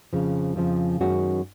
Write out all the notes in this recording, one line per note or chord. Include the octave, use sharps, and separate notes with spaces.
F2 C#3 F3
F2 C#3 F3
F#2 D#3 G#3 C#4 F#4